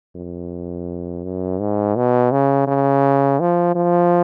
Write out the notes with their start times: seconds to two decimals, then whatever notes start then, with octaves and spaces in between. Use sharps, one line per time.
0.16 F2
1.24 F#2
1.60 G#2
1.96 B2
2.32 C#3
2.67 C#3
3.40 F3
3.75 F3